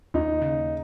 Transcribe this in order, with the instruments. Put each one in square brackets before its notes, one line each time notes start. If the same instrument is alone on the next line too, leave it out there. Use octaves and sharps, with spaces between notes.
[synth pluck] D#2 [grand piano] D#4
[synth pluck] C#3